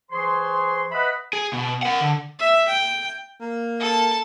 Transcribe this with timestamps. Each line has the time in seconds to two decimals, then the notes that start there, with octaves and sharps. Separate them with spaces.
0.11 E3 G#4 C5 C#5 C6
0.92 B4 D#5 E5 F#5 B5
1.33 G#4
1.53 B2
1.83 A#4 F#5
2.01 D3
2.39 E5
2.68 G5
3.41 A#3
3.80 A4 A5